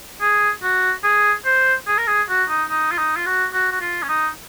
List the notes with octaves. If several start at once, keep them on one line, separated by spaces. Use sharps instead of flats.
G#4
F#4
G#4
C5
G#4
A#4
G#4
F#4
D#4
D#4
F4
D#4
F4
F#4
F#4
F#4
F4
C#4
D#4